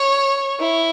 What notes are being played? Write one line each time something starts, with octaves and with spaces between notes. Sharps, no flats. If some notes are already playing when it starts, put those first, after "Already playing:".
Already playing: C#5
E4